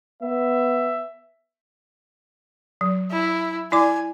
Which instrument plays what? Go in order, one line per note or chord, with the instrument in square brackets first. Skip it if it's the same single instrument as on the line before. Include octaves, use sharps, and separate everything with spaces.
[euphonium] B3 [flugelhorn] E5
[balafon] F#3
[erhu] E4
[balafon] E4 D5 D6 [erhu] G#5